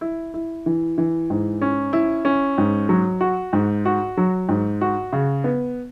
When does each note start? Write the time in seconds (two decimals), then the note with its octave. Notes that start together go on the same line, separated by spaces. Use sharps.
0.01 E4
0.34 E4
0.66 E3
0.98 E3
1.30 G#2
1.62 C#4
1.93 E4
2.25 C#4
2.58 G#2
2.89 F#3
3.21 F#4
3.53 G#2
3.85 F#4
4.17 F#3
4.49 G#2
4.81 F#4
5.13 C#3
5.44 B3